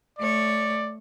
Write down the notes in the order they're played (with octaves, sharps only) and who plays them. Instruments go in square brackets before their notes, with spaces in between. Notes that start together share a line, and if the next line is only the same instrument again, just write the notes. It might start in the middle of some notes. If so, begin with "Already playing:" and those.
[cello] A3 C#5 [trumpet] D5